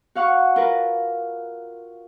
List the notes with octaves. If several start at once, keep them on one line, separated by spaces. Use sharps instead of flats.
F#4 F5 F#5 C#6
F4 A#4 B4